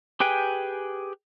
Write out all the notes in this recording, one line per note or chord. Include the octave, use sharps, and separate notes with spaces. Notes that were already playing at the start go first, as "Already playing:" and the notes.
G4 G#4 B4 G5 G#5